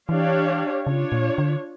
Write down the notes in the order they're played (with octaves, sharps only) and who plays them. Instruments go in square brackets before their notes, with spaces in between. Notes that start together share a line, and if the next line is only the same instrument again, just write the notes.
[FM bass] E3 [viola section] D4 G4 C#5 F5
[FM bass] C#3 [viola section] D4 F4 C#5
[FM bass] A#2
D3